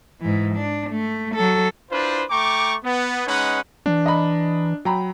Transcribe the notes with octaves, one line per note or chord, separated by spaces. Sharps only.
G#2 E3
D4
A3
F#3 A4
D4 E4 F4 B4 C5
A3 G5 A#5 C#6 D6
B3
G#3 C#4 D#4 B4 C#5 F#5
E3 D4
D#5 A#5 B5
F#3 G5 A#5 B5